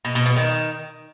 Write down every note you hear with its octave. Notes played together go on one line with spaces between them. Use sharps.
B2
B2
B2
D#3